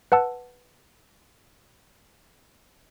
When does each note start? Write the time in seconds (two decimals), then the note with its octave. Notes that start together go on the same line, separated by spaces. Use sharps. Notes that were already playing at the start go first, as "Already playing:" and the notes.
0.12 B4 F#5 A5 E6